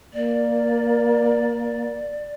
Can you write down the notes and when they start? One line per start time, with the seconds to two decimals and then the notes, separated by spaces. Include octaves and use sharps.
0.14 A#3 D5